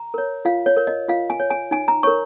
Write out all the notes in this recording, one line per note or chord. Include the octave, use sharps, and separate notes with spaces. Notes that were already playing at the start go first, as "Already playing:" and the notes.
Already playing: A#5
A#4 C#5
F4 F5
C#5
A#4 C#5
D#5
F4 F5
G#5
C#5
G#5
D#4 G#5
A#5
A#4 C#5 C#6